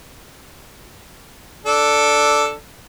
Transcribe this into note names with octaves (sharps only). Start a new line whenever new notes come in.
D4 A4